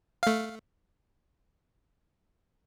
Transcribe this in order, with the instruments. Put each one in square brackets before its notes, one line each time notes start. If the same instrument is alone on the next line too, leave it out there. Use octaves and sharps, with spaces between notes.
[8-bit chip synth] A3 F5